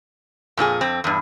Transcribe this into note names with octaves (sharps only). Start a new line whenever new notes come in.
F2 A#2 D4 G#4
F2 C4
E2 G2